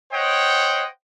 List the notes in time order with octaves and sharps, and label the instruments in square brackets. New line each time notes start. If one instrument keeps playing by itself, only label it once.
[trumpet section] C5 C#5 D#5 F#5 G5